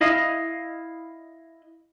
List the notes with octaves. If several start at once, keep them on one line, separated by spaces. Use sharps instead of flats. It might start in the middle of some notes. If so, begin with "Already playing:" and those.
E4 D#5 F5